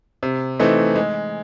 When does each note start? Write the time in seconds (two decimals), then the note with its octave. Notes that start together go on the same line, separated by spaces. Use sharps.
0.23 C3
0.60 E3 A3 C4 D#4
0.95 G#3